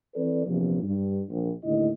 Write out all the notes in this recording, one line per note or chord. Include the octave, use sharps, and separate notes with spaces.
E3 C4 A4 B4 D5
A#1 E2 C3 F3
G2
A#1
D#2 A2 D3 E4 D#5